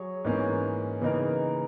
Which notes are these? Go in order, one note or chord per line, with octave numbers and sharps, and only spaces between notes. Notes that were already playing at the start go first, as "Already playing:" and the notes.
Already playing: F#3 G#4 C#5
G#2 E3 A#3 C#4
C#3 E3 A#3 D#4 A#4